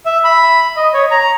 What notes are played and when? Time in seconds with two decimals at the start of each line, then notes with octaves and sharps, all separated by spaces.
0.06 E5
0.24 B5
0.76 D#5
0.94 C#5
1.11 A#5